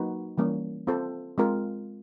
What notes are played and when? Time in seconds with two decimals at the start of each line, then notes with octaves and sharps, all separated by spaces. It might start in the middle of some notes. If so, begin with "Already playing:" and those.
Already playing: F#3 A#3 D#4 F#4 B4
0.38 E3 G3 A#3 C#4
0.87 C4 F4 A4 C5
1.38 G#3 C4 F4 A#4